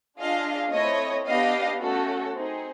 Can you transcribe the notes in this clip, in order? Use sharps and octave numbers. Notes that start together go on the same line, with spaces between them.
D4 F4 G#4 D#5 F5
A3 C4 E4 C#5 D#5
B3 D4 G4 D#5 F5
A3 C#4 F#4 A4
C4 D#4 G#4